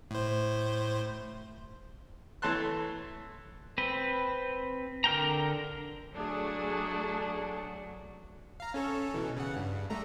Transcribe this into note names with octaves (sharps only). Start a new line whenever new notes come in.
A2 C5
E3 A3 C#5 A5 C6 F#6
C4 B4
D3 A#4 G5 A#5
F#3 A3 D4 G#4
F5 A#5
C#4 A4 C#5
B2 E3
C#3 F#5
G2
G3 A3 A#5